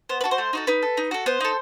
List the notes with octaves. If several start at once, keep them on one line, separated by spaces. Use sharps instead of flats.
B3 C5
B4
F#4 A4
C5
A3
D#4 F#4 A4
D#4 B4
A4
D#4
F#4 A4
B3 C5
D#4 A4